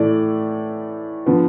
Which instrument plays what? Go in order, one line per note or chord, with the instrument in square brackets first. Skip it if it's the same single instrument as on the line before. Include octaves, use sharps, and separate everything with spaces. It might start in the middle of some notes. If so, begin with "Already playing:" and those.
Already playing: [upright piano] A2 E3 A3 D5
D3 F3 B3